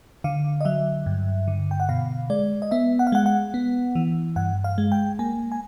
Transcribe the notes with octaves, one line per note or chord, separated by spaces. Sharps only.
D3 F5
D#5
F#3 E5
G2
D3
G5
F#5
B2 F5
G#3 D5
D#5
B3 E5
F#5
F5
G#3 F#5
F#5
B3
E3
G2 F#5
F5
G#3
G5
A#3 G#5
G#5